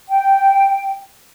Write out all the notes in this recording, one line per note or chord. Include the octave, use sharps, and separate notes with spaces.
G5